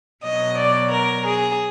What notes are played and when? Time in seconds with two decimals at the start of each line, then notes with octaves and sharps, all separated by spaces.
0.24 B2 F#3 D#5
0.58 D5
0.92 A#4
1.26 G#4